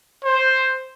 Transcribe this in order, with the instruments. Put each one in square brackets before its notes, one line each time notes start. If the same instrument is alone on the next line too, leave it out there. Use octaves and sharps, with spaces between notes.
[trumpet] C5